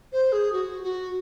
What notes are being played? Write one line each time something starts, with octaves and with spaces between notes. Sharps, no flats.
C5
G#4
F#4
F#4